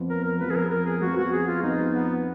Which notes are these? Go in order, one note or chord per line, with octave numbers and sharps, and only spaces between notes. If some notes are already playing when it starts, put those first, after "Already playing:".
Already playing: F2 F3 B3
A#4
A#4
F2 F3 B3 B4
G#4
A#4
A#4
G#4
F2 F3 B3 F#4
F#4
G#4
F4
F2 F3 B3 D#4
B3